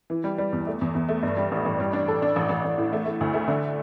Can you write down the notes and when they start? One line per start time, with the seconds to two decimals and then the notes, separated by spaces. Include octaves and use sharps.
0.10 E3
0.24 G3
0.38 G3
0.53 E2
0.67 A3
0.81 E2
0.95 E2
1.09 A3
1.23 G2
1.37 G3
1.52 A1
1.65 A1
1.80 G3
1.93 D4
2.08 A4
2.22 D4
2.36 A1
2.49 A1
2.65 A1
2.78 A2
2.93 A3
3.06 A3
3.21 D2
3.34 A3
3.48 D3